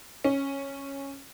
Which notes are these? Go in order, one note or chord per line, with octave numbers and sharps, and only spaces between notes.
C#4